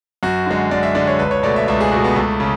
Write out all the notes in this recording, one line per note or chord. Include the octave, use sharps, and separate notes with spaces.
F#2 F#4
D3 G#3
F#2 D5
E5
D3 G#3 D5
C#5
C#2 B4
C#5
B2 A3 D5
E5
C#2 E5
G#4
B2 A3 F#4
B3
C#2 A3
C#3